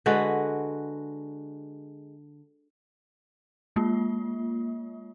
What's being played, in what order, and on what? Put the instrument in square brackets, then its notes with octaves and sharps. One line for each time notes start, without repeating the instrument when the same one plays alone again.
[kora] D3 G#3 F#4 B4
[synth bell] G#3 A#3 F4